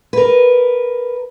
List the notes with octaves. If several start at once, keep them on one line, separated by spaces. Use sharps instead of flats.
A#4 B4